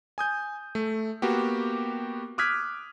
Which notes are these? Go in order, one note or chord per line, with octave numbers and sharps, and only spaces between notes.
G#5 D#6 G6
A3
A#3 B3 F#4 G4
D6 D#6 F6 F#6 G#6 B6